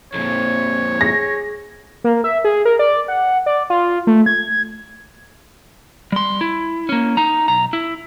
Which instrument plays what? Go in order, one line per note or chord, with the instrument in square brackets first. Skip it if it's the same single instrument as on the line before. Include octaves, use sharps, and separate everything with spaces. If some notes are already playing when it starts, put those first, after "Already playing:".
[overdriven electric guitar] F2 A#2 [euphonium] C4 [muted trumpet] C#5
[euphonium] G#4 [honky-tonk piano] A#6
[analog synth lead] A#3
E5
G#4
A#4
D5
F#5
D5
F4
A3
G#6
[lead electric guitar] G3 C6
E4
A#3 C#4
D#4 A#5
B1 A#5
E4